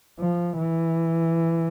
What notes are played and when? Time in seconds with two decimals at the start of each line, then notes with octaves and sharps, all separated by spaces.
0.20 F3
0.58 E3